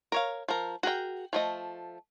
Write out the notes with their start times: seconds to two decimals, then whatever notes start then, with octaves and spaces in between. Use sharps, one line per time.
0.12 A#4 C#5 F5
0.48 F3 A#4
0.83 F#4 G#4 A#4 G5
1.33 F3 A3 D#5